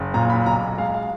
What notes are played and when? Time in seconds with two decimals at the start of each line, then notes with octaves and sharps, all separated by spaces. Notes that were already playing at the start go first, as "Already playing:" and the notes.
Already playing: F#1
0.14 A#2 A#5
0.30 B5
0.46 B1 A#5
0.78 G#3 F5
0.94 F5